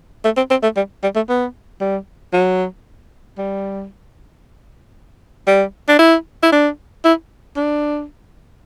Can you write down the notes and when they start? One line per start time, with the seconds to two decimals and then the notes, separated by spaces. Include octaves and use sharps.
0.25 A3
0.37 C4
0.50 C4
0.63 A3
0.76 G3
1.03 G3
1.15 A3
1.29 B3
1.81 G3
2.33 F#3
3.38 G3
5.47 G3
5.88 D4
5.99 E4
6.43 E4
6.52 D4
7.05 E4
7.56 D4